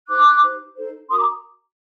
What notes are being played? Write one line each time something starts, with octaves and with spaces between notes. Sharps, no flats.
D#4 G4 C5 D6 F#6
D#4 G4 C5
D#4 A4 C5
D4 F#4 A#4 C6 D#6
A#5 D6